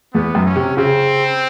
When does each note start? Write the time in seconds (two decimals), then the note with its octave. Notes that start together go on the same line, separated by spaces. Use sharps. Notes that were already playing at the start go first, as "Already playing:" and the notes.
0.14 E2 B3
0.35 F#2
0.45 C#4
0.56 C3
0.77 C#3 C4